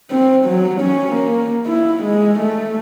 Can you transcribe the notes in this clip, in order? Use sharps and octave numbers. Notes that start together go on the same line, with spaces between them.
C4
F#3
C#4
A#3
E4
G#3
A3